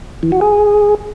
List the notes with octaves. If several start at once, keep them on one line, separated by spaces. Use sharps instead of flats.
E3
F#4
G#4